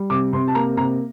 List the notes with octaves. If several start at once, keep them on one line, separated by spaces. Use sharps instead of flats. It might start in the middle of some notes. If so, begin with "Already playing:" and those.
Already playing: G3
C3 D6
C3 C6
A5
A#3 A#5
C3 A#5